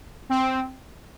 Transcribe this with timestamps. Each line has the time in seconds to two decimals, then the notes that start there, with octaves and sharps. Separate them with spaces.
0.29 C4